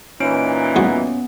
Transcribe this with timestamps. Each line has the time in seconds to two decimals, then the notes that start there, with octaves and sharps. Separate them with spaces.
0.20 A#2 E3 C#4 D#4 D7
0.76 E2 F#3 B3